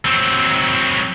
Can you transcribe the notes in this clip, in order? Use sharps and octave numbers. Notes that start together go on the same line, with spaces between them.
F#3 C4